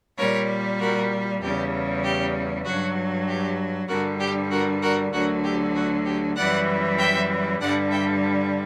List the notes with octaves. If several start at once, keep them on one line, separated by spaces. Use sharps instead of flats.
A#2 G3 A#4 C#5
F#4 A#4
E2 C#3 G3 G4
G4
G2 F#3 F#4
G4
G2 D3 G3 F#4 A#4
G4
F#4 A#4
F#4 A#4
D2 D3 F#3 F#4 A#4
G4
F#4
G4
F#2 E3 G3 D5 F#5
E5 G5
G2 D3 G3 D5 F#5
E5 G5